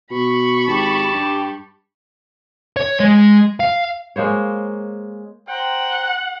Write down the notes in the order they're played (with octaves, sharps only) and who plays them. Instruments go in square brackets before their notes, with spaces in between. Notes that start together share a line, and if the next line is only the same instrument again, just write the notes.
[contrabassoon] B2 [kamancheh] B5 C#6
[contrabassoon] G#1 [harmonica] G4 A5
[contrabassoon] G2
[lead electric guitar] C#5
G#3
F5
[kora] G#3 A#3 C5 C#5
[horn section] C5 G5 A#5 [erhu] F#5